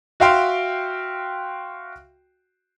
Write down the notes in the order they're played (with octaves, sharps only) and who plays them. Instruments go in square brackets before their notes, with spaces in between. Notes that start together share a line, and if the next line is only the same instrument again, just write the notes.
[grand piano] F#4 E5 F5 G5 C6 F6